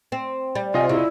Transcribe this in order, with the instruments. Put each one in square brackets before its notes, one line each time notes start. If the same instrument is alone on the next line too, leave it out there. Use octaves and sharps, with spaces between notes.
[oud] C4
G3
[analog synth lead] C3 [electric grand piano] F4 D#5 [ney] G#5
[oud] C#3 [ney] E4